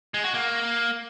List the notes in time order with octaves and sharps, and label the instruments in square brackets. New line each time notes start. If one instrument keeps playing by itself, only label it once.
[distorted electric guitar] G#3
F#4
A#3